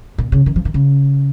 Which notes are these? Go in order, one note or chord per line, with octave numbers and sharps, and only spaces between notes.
A#2
C#3
D#3
F3
D#3
C#3